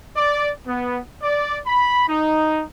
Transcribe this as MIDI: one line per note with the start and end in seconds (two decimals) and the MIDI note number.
0.17 0.50 74
0.67 1.00 59
1.21 1.58 74
1.66 2.07 83
2.08 2.63 63